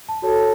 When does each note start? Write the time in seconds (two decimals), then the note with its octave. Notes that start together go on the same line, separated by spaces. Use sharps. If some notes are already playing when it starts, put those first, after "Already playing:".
0.09 A5
0.22 F#4 A4 C#5